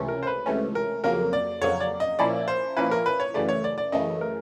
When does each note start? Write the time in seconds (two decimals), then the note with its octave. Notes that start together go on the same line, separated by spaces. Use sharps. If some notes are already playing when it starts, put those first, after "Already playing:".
Already playing: C#2 C3 E3 A3 C#4
0.08 A#4
0.23 C5
0.27 B4
0.46 C#2 C3 E3 A3 C#4
0.75 A#4
1.04 F2 C#3 F#3 A#3 A#4
1.33 D5
1.62 F2 C#3 F#3 A#3 C#5
1.80 D5
2.00 D#5
2.19 A#2 F3 A#3 C#4 E4 D5
2.48 C5
2.77 A#2 F3 A#3 C#4 E4 B4
2.91 A#4
3.06 B4
3.20 C#5
3.34 F#2 C#3 E3 A3 D5
3.49 C#5
3.64 D5
3.78 D5
3.92 F#2 C#3 E3 A3 D#5
4.21 A#4